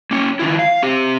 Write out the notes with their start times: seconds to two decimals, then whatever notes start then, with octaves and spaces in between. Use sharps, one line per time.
0.11 A#3 C#4
0.39 D#3 F3 E4
0.59 F5
0.83 C4 G4